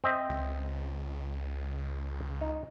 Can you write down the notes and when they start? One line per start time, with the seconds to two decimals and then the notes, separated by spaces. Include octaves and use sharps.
0.04 C4 D#5 E5
0.29 C#2
2.41 D#4